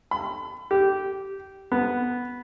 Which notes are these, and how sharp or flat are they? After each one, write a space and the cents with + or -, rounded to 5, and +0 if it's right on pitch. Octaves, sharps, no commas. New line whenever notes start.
B5 +35
G4 -15
B3 -5